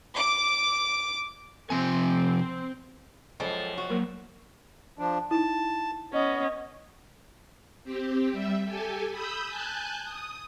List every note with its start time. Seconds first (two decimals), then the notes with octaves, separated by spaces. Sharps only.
0.16 D6
1.70 C3 F3 C4 G#5
3.40 F#2 F3 G#3 A4 G5
3.78 F#4
3.90 F#3 A#3 A#4
4.99 F3 D4
5.31 D#4 E4 A5
6.13 B3 C#4 D#5
7.84 C4 G4
8.32 G3 E5
8.64 G4 A4 G#5
9.11 B5 D#6 E6 G6
9.48 G#5 A5 F#6 G6
10.04 D#6